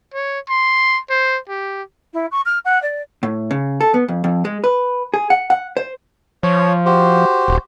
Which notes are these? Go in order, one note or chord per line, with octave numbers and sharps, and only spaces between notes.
C#5
C6
C5
G4
E4
C#6
F6
F#5
D5
A2
C#3
A4
B3
F2
F2
G#3
B4
G#4
F#5
F#5
C5
F3 C#5
F#4 G4 C5
D#1